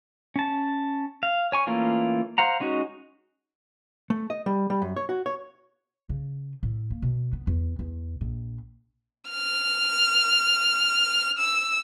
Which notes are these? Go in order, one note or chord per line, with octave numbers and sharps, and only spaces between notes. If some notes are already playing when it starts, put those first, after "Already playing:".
C#4 A5
F5
C#5 G#5 C#6
E3 A3 A#3 C#4 F4
C5 F5 F#5 A#5
G#3 C#4 D#4 F#4
A3
D#5
G3
G3
F#2
C#5
F#4
C#5
C#3
A2
A#3
B2
B3
E2
E2
A#1
F6
E6